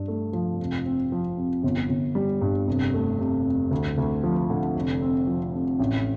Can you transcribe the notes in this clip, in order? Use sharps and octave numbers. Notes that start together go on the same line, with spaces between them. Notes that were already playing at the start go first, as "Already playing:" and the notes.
Already playing: G2 D4
A3
F3
F1
C4
F3
F2
G1
G1
G3
G2
F1
A3
C3
F2
D2
D2
F3
D3
F1
C4
F3
F2
A1